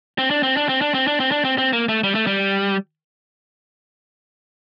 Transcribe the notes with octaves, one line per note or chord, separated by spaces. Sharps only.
C4
D4
C4
D4
C4
D4
C4
D4
C4
D4
C4
C4
A#3
A3
G3
A3
G3